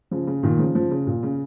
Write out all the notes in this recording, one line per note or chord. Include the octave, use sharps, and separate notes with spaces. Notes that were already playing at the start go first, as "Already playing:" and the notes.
C#3 F3
C#3
A#2 D#3
C#3 F3
C#3 F3
C#3
A#2
C#3